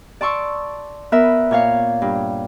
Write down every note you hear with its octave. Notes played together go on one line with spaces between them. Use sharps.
D5 A5 C6 C#6 E6
B3 A#4 B4 E5
A#2 C#5 F5
G2